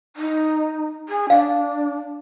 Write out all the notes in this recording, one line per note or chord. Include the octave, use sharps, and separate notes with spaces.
D#4
G#4
D4 F5